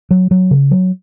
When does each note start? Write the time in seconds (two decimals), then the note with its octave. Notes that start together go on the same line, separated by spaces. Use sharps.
0.11 F#3
0.31 F#3
0.51 C#3
0.71 F#3